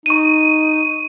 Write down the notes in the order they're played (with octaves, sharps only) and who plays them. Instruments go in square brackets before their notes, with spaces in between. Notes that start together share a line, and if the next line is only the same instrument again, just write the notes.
[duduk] D#4 [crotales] C#6 D#7